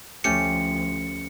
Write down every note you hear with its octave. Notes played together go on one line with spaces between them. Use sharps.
D2 F3 A3 C#4 G4 C#7